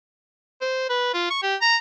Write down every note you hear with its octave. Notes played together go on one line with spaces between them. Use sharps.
C5
B4
F4
C#6
G4
A#5